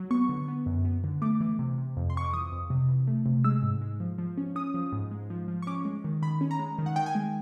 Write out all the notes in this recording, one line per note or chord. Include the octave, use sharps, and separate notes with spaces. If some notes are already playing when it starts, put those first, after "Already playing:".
Already playing: F#3
B3 C#6
D3
B3
F#2
B3
D3
A3 D6
E3
C3
C3
F2
C6
F2 C#6
D6
E3 D#6
F2
C3
E3
A3
C3
G#3 E6
G#2
G#3
F3
F3
C#4
C#4 D#6
F3
G#2
G#3
F3
F3
C#6
C#4 D6
G#3
D#3
D#3 B5
C#4
A#5
G#3
D#3
F#5
D#3 G5
G#5
G#3